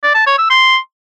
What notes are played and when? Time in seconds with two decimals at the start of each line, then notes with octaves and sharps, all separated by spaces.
0.03 D5
0.15 A5
0.26 C#5
0.38 E6
0.50 C6